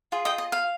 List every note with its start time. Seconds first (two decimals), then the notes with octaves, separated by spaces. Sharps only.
0.12 F4 G#4
0.25 D#5 G5
0.38 D#5
0.52 F5